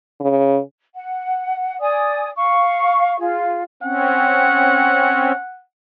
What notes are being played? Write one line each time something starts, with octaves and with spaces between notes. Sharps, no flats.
C#3
F#5
D5 G#5 D#6
F5 C#6
F4 G#4
C4 C#4 F#5